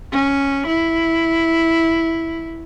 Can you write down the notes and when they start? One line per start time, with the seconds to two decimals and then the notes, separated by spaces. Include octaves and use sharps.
0.12 C#4
0.67 E4